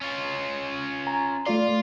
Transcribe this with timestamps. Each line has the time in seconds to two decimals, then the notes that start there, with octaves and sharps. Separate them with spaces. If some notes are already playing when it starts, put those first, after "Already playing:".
0.01 C#4 F4
1.07 G#5 A#5
1.47 A3 F4 D5 F5 C6